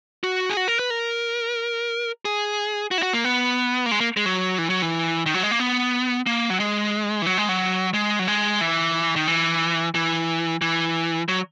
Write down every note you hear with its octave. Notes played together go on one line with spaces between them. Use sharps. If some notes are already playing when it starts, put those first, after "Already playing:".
F#4
G#4
F#4
A#4
B4
A#4
G#4
F#4
E4
F#4
A#3
B3
A#3
G#3
A#3
G#3
F#3
E3
F#3
E3
D#3
F#3
G#3
A#3
B3
A#3
F#3
G#3
E3
F#3
G#3
F#3
G#3
F#3
G#3
E3
D#3
E3
E3
E3
F#3